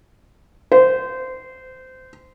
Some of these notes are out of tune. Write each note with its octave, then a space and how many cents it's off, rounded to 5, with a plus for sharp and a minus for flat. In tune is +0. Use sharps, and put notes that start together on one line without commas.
C5 -20